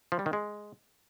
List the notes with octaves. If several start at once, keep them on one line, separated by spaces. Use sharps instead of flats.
F3
G3
D#3
G#3